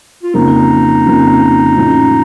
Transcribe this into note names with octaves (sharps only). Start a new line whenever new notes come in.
F4
F2 C#3 F3 A#3 D#4
F2 C#3 F3 A#3
A1 A2 F3